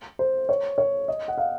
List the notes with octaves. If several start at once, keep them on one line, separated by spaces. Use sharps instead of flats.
C5
C#5
C#5
D#5
F#5
F5